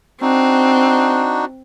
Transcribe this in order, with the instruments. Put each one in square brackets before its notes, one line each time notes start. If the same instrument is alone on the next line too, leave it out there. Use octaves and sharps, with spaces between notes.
[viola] C4 [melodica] D4 D#4 F#4